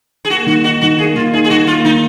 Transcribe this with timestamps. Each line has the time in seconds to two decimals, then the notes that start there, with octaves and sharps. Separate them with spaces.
0.25 G#4
0.30 A#3 F#4
0.47 D#3 F#4
0.64 D#4 F#4
0.81 D#3 F#4
0.98 A#3 G#4
1.16 D#3 F4
1.33 D#4 G#4
1.44 G#4
1.50 D#3 F#4
1.67 A#3 F4
1.85 D#3 D#4